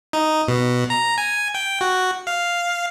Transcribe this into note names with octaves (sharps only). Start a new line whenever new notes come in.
D#4
B2
A#5
G#5
G5
F#4
F5